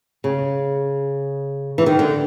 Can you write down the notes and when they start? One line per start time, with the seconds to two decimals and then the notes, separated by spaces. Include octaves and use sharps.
0.24 C#3
1.78 E3
1.86 D#3
1.99 D3